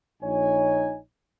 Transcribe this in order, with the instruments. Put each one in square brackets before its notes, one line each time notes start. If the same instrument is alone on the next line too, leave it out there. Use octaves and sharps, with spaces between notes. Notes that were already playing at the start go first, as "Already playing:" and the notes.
[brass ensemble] A#1 D#4 C#5 G#5